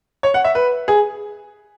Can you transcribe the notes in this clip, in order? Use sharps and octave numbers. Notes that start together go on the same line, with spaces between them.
C#5
F#5
E5
B4
G#4